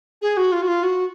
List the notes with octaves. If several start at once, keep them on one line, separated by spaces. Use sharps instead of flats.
G#4
F#4
F4
F#4
F4
F#4